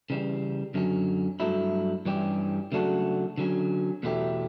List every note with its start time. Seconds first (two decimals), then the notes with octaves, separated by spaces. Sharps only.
0.10 C#3 E3 G3
0.74 F#2 D3 F#3 C#4
1.40 G2 F#3 A3 E4
2.05 G2 E3 G3 C#4 G4
2.72 C#3 F#3 A3 D4 F#4
3.38 D3 F#3 C#4
4.03 E2 B2 A3 E4 G4